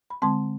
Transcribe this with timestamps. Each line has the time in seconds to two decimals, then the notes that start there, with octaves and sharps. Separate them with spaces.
0.10 B5
0.22 D3 G#3 C4 A5 C6